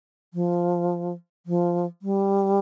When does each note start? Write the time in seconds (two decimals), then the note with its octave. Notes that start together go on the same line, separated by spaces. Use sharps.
0.34 F3
1.46 F3
2.02 G3